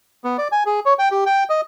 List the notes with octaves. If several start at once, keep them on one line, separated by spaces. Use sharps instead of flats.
B3
D5
G#5
G#4
C#5
G5
G4
G5
D#5